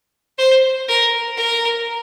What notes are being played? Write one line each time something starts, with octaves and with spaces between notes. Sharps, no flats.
C5
A#4
A#4